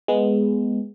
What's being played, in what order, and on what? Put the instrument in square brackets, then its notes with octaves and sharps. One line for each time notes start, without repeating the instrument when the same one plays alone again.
[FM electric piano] G#3 B3